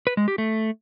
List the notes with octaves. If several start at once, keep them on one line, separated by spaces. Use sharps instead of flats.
B4
G#3
G4
A3